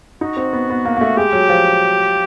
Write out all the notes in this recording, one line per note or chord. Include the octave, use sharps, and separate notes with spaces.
D#4 F#4
C4
B3
B3
A#3
A#3
A3
G#3 G4
F#3
F3